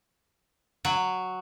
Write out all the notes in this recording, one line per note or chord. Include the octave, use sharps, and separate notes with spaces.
F#3